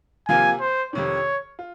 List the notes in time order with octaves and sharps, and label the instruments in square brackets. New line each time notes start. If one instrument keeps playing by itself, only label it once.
[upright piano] C3 F3 A#3 F4 [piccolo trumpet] G#5
[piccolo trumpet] C5
[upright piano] F2 C3 D#3 [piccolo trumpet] C#5
[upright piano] F4